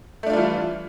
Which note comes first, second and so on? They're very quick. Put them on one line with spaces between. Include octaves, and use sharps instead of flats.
A3 D4 F4 G3 E3